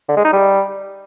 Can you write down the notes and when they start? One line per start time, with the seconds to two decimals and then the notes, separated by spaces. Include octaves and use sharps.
0.09 D3
0.17 G#3
0.25 D#4
0.33 G3